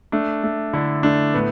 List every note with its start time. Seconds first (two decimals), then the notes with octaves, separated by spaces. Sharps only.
0.12 A3 D4
0.43 A3
0.73 D3 E4
1.03 A3 D4
1.34 A2 B3